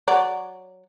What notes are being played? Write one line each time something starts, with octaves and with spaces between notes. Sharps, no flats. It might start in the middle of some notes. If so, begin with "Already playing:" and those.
F#3 D5